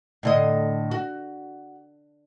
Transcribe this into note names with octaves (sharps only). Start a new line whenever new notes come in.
A2 D3 D#5
F#4